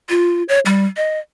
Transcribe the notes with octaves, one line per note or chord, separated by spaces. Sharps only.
F4
C#5
G3
D#5